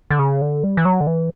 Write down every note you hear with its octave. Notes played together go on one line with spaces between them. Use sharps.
D3
C#3
D3
G3
E3
F#3
D3
E3